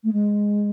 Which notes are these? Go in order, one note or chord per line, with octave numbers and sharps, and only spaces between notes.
A3
G#3